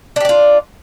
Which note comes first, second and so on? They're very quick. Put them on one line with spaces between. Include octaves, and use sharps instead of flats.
D4 G4 D5 F4